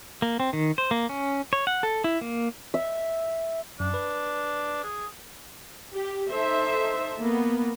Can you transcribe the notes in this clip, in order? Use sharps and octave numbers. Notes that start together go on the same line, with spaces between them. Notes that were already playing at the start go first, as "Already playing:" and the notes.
A#3
C4
D#3
C5
A#3
C#4
C#5
F#5
A4
E4
A#3
E5
F#2 D4
B4
G#4
G4
D#4 A4 C5 E5
A#3 B3